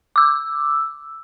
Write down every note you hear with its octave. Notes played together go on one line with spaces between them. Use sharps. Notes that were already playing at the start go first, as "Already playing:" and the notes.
D6 E6